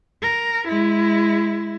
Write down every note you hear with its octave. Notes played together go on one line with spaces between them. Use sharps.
A#4
G#3 E4